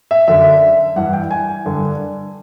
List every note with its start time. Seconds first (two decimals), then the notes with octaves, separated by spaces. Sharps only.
0.11 E5
0.28 F#2 D3 E5
0.96 G2 E3 F#5
1.13 G5
1.31 G#5
1.66 G2 D3